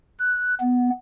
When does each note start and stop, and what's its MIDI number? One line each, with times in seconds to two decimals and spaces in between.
0.19 0.55 90
0.61 0.90 59